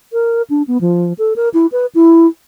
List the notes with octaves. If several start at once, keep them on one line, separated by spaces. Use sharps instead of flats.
A#4
D4
B3
F3
A4
A#4
E4
B4
E4